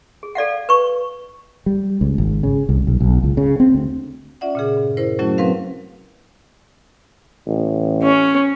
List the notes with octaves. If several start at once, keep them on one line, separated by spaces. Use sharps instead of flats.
G#4
A4 D5 F5 F#5
B4 C#6
G3
C#2
G#1
C#3
C2
B1
B1
C#2
C#3
C4
D2
C#4 F4 D5 E5 F#5
A#2 C#3 G#4
G2
E4 A#4 C5
F#3 A3 C#4 E4 F#4
F#3 C4 A#4 B4 F5
A1
C#4